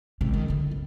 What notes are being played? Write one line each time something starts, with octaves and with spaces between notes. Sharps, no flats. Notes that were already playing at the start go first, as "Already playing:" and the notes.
G#1 C3
D#3
D3 E4
G1